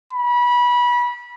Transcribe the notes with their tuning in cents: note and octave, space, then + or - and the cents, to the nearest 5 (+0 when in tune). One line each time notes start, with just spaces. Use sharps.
B5 -25